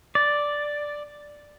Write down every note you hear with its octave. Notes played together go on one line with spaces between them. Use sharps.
D5